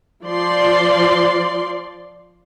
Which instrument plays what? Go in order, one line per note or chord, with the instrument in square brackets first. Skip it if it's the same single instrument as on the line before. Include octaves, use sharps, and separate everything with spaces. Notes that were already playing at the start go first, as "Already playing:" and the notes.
[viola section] F3 D5 C6